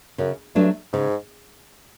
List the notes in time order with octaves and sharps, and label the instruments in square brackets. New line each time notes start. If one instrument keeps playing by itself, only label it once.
[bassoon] F#2 [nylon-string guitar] C#3
[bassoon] G2 [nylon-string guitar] F#3 A3 D4
[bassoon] G#2 [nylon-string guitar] C#3